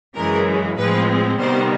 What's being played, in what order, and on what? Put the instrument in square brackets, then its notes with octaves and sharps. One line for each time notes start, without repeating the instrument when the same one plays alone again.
[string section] F#2 C#3 E3 G#3 A#4
A2 F3 G#3 C4 B4
C3 D#3 G3 B3 C5